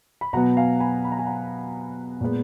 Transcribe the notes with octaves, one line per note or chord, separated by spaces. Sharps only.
B5
B2 F#3 B3 F#5 A#5
F5 G#5
G#5 B5
B5
A#5
G#5
F#5 A#5
A#2 G#3 B3